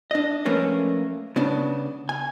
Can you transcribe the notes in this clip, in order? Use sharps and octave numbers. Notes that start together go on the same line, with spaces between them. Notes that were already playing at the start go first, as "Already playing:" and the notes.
D4 D#5
F3 A3 A#3 C#4 B4
C#3 B3 D4
G#5